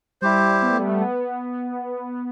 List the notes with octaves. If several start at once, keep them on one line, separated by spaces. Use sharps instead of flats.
G3 E4 G4 C5
B3
A3
G3
A3
B3